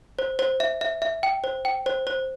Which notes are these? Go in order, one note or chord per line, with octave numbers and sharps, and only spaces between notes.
C5
C5
E5
E5
E5
G5
C5
G5
C5
C5